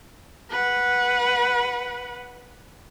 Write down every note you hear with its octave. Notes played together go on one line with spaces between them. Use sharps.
B4 F#5